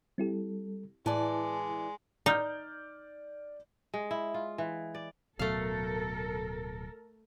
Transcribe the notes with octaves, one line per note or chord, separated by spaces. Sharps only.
G3 C4 E4 G4 A4
A2 E3 G#3 E4 D5 A5
D#4 D5 F6 G6
G#3
E4
F4
E3
D5
D1 B2 F#3 A3 A4 A#4 F5